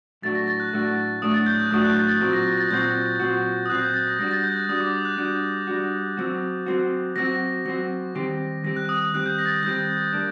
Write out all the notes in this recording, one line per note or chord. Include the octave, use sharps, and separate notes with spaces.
A2 F#3 A3 D4 F#4 A6
A#6
A6
F#6
A2 F#3 A3 D4 F#4
A2 F#3 A3 D4 F#4 D#6
A6
G6
F#6
A2 F#3 A3 D4 F#4 D#6
F#6
A6
A6
A#2 F#3 C4 F#4
A#6
A#6
A6
A#2 F#3 C4 F#4 G6
A#2 F#3 C4 F#4
D#6
A#2 F#3 C4 F#4 F#6
G6
A6
A#6
G3 D4 F#4 A#6
A6
G6
F#6
G3 D4 F#4 D#6
D6
D#6
F#6
G3 D4 F#4 G6
G3 D4 F#4
F#3 C4 F#4
F#3 C4 F#4
F#3 C4 F#4 A#6
F#3 C4 F#4
D#3 G3 C4 G4
D#3 G3 C4 G4 A#6
F#6
D#6
D#6
D#3 G3 C4 G4 F#6
G6
A#6
A6
A#6
D#3 G3 C4 G4 G6
G3 A#3 D4